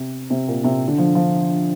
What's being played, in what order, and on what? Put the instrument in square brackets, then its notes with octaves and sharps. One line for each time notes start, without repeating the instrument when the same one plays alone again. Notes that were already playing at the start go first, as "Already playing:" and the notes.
Already playing: [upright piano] C3
C3
A#2
C3
D3
F3
F3